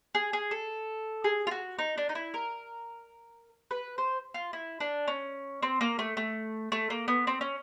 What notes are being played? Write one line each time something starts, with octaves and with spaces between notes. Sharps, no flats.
G#4
G#4
A4
G#4
F4
F#4
D#4
D4
D#4
E4
A#4
B4
C5
F4
E4
D4
C#4
C4
A#3
A3
A3
A3
A#3
B3
C4
C#4